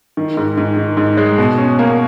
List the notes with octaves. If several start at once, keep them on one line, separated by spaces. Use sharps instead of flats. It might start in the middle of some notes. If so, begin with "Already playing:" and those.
D#3
G#2
G#2
D#3
G#2
G#3
B2
C#4
A#3